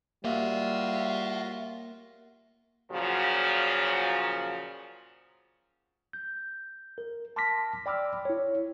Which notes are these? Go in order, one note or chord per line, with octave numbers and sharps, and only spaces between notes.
G3 A#3 F4 F#4 C#5 E5
A#2 C#3 F3 F#3
G6
A#4
A5 C6 D6 F6 A#6 B6
D5 G5 B5 D6 E6 F6
E4 C#5